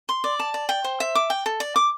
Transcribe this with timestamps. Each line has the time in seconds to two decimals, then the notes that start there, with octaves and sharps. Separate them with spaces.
0.09 C6
0.24 D5
0.39 A5
0.54 D5
0.69 G5
0.84 C5
1.00 E5
1.15 D6
1.30 G5
1.46 A4
1.60 D5
1.76 D6